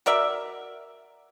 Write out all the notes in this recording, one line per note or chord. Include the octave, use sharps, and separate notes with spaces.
F#4 A#4 D5 E5